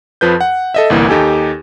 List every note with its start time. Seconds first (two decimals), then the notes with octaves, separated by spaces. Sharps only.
0.21 F2 F3 B4 G6
0.41 F#5
0.74 A4 D#5 E5
0.90 G1 C2 E3 A#3
1.09 D#2 D#4 G4 A4 G#5